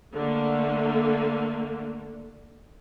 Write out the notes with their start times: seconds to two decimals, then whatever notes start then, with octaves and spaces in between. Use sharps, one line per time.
0.14 D3 A3 A#3